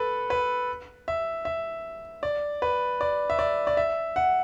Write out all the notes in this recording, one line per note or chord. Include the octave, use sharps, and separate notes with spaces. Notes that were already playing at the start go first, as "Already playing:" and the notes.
Already playing: A4 B4
B4
E5
E5
D5
B4
D5
E5
D5
D5
E5
F#5